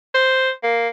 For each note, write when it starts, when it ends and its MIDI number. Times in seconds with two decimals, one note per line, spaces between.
0.15 0.50 72
0.63 0.88 58